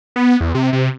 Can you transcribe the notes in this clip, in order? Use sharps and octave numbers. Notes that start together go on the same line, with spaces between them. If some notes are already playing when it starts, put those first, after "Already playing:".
B3
E2
C3
C3